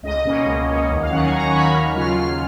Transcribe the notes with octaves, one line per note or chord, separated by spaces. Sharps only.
C#2 D#5
B2 A#3 C#4
C#2
B2 A#3 C#4
D#2
F5
D#3 F#3 C#4 F#5
G#5
D#2 A#5
C#6
D#3 F#3 C#4 B5
D#2 F6
C#3 F#3 C#4 F4 F6
D#2 F6